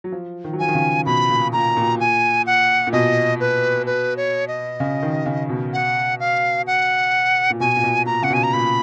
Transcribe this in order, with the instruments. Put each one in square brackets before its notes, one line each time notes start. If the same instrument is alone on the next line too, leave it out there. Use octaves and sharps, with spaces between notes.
[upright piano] F#3
F3
D#3
F#3
[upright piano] F3 [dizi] G#5
[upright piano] D#3
C#3
[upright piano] B2 [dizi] B5
[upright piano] A#2
[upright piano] A#2 [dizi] A#5
[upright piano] A#2
[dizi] G#5
F#5
[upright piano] A#2
[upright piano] B2 [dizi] D#5
[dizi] B4
B4
C#5
D#5
[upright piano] C#3
D#3
C#3
B2
[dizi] F#5
F5
F#5
[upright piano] A#2
[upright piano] B2 [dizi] G#5
[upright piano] A#2
B2
[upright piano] A#2 [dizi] A#5
[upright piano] C#3 [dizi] F#5
[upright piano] B2 [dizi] G#5
[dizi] A#5
[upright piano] A#2 [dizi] B5